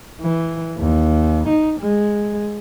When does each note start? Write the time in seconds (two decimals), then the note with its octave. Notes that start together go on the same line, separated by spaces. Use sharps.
0.22 E3
0.78 D#2
1.48 D#4
1.80 G#3